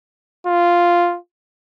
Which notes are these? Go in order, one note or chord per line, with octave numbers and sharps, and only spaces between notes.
F4